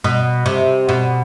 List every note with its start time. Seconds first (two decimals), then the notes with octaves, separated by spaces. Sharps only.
0.04 B2
0.46 C3
0.89 B2